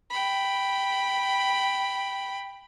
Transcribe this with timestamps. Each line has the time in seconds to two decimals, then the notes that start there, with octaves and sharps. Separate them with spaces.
0.10 G5 B5